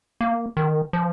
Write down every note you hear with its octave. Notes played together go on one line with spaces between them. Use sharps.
A#3
D#3
F3